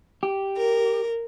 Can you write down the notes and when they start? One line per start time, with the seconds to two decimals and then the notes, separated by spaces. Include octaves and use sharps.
0.23 G4
0.57 A#4